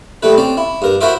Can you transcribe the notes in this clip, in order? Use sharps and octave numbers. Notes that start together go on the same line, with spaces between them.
G3 A3 E4 B4
C4 C#4 D5
E4
G2 A#4
E4 F#4 A#4 C5 E5 D6